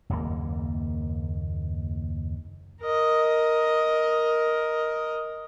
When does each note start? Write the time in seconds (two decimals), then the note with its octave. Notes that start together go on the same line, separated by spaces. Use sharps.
0.10 F#1 D#2 G#2 A#3
2.82 A#4 D#5